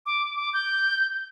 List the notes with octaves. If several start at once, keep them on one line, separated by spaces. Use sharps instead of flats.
D6
D6
G6